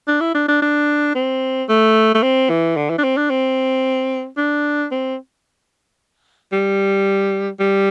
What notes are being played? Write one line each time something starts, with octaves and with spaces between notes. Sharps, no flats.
D4
E4
D4
D4
D4
C4
A3
A3
C4
E3
D3
E3
D4
C4
D4
C4
D4
C4
G3
G3